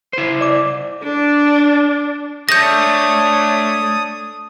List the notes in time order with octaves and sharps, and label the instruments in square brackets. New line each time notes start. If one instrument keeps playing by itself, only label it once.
[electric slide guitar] E4 C5
[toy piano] D5 D6
[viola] D4
[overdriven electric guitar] A3 [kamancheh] D4 C#5 [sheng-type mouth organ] D#6 [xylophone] G6 A#6